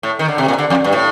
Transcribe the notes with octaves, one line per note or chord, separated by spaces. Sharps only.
A2
D#3
D3
C3
A#2
D3
F2
G2
A2